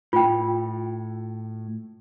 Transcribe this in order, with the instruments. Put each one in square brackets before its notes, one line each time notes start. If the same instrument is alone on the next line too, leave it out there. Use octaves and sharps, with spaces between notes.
[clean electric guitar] A2 [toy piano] F4 G5